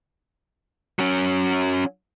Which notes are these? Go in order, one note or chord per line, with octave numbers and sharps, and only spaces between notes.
F#3 C#4